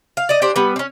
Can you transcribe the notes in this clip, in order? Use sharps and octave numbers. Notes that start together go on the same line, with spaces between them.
F5
D5 D#5
D4 G4 C5
G3 B3
C4 C#4